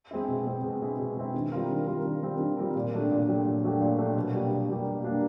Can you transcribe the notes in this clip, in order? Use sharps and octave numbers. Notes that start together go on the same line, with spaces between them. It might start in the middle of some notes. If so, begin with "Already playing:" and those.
G#3 C4 E4
B2
G#3 C4 E4
B2
G#3 C4 E4
B2
G#3 C4 E4
D#3
G3 C4 F4 A#4
D#3
G3 C4 F4 A#4
D#3
G3 C4 F4 A#4
D#3
G3 C4 F4 A#4
A#2
F#3 A3 D4 G4
A#2
F#3 A3 D4 G4
A#2
F#3 A3 D4 G4
A#2
F#3 A3 D4 G4
B2
G3 A#3 D4 G4
B2
G3 A#3 D4 G4
B2
G3 A#3 D4 G4